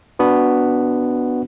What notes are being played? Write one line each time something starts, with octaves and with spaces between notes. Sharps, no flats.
B3 D4 F#4